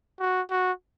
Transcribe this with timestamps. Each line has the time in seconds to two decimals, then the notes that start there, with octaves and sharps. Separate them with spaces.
0.20 F#4
0.50 F#4